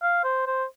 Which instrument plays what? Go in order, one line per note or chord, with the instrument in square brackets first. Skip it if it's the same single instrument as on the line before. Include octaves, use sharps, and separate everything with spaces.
[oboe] F5
C5
C5